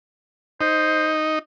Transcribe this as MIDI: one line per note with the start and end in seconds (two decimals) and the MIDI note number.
0.61 1.39 63
0.61 1.16 72